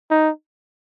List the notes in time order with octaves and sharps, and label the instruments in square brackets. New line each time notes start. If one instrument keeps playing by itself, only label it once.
[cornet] D#4